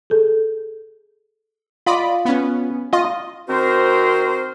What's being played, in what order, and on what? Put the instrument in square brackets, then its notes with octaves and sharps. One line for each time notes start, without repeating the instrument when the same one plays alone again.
[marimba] G#4 A4
[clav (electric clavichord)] F4 [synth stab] D5 D#5 B5
[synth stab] B3 C#4
[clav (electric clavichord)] F4 [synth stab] D#5
[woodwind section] D#3 C4 F#4 A#4 C5